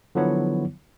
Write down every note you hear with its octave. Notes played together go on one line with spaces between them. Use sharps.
D3 F3 F#3 B3 E4 C#5